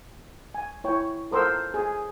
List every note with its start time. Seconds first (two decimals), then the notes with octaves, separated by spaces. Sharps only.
0.55 G#5
0.84 E4 C#5 G5
1.31 A4 A#4 C5 C6 E6
1.74 G#4